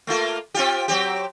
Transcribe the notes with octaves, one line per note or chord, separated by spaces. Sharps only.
A3 A#3 F4
C4 F4 G4
F#3 C4 G4